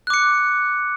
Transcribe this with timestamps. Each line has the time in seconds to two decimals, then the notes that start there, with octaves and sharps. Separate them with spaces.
0.07 F#6
0.10 D6
0.14 C#7